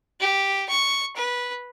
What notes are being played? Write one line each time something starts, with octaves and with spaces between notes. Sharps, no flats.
G4
C#6
B4